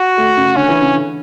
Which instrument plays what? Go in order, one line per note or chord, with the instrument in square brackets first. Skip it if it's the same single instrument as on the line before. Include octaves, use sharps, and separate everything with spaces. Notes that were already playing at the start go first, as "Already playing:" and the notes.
Already playing: [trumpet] F#4
[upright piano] A3
C#3
[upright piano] D3 [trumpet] C#4
[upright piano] E3
C#3
D3